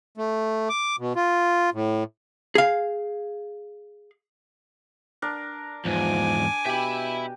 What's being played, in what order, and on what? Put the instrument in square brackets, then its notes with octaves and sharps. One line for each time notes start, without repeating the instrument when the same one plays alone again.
[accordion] A3
D6
B2
F4
A2
[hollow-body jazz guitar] G#4 F5
[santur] D4 A#4
[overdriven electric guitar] E2 G#2 [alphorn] F3 [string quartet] G#5 D6
[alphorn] B2 [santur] G4 [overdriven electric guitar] E5 B5